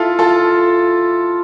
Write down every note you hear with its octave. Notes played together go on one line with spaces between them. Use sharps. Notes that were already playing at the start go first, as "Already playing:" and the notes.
Already playing: E4 F4 A4
F4 A4